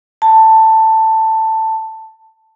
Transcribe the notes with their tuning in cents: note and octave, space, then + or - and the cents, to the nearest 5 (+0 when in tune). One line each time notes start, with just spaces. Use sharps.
A5 +10